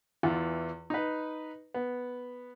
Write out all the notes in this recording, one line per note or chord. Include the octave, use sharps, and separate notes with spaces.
E2 E3 F4
D#4 B4
B3